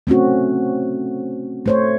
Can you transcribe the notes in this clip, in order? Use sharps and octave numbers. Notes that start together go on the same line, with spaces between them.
A3 C4 C#4 F#4
A3 C5 C#5